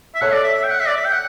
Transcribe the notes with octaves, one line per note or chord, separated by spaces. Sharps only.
E5
A4 C#5 F#5
D5
E5
E5
G5
F#5
E5
D5
E5
G5
F#5